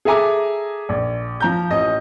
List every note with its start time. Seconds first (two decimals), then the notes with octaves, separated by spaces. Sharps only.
0.05 G#4 A4 E5 G#5 A#5 D6
0.89 A#1
1.40 F3 A#5 G6
1.70 A1 D#5